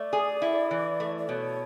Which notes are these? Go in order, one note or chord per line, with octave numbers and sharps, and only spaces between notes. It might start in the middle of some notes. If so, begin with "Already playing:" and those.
Already playing: A3 D5
G#4
E4
E3
A3
D5
B2 C#5